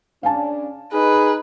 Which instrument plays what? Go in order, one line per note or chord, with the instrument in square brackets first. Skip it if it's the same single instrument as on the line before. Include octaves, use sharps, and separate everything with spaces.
[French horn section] C#3 C#4 D4 [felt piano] F5 G#5 A5
[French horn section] D#4 [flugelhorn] G#4 [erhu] B4